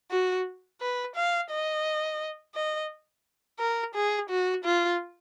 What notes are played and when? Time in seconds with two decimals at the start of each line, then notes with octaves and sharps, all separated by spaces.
0.11 F#4
0.81 B4
1.16 F5
1.51 D#5
2.55 D#5
3.60 A#4
3.95 G#4
4.30 F#4
4.65 F4